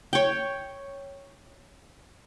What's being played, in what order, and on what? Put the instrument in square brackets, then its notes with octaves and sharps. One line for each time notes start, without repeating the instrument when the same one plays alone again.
[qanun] C#5 G5